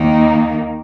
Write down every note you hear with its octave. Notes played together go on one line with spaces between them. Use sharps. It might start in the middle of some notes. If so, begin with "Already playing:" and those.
Already playing: D#2 D#3 A#3 D#4